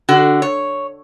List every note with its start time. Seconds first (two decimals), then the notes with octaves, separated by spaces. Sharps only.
0.09 D3 F#4
0.42 C#5